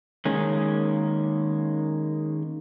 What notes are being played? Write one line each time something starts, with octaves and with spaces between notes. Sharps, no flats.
D#3 G#3 A#3 C#4